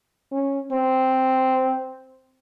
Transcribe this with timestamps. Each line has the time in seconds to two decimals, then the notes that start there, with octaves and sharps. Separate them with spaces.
0.32 C#4
0.72 C4